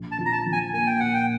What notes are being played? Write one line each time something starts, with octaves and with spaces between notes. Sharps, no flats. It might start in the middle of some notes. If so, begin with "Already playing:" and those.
Already playing: A#1
A5
F3
A#5
A5
F3
G#5
A#3 G#5
G5
A#2 F#5
G5